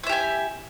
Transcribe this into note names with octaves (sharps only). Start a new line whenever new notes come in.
E4 G4 E5 G#5